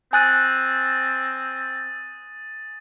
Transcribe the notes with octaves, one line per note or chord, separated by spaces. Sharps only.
C4 G#5 D#6 F#6 A6 D#7